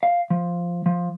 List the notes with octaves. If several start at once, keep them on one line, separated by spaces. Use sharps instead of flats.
F5
F3
F3